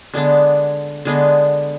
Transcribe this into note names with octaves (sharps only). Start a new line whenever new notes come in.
D3 G#3 B3 D4
D3 G#3 B3 D4